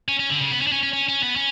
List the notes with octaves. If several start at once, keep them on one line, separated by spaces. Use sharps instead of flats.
C#4
C#4
D3
C#3
B3
C#4
D4
C#4
C#4
C#4
C#4
B3
C#4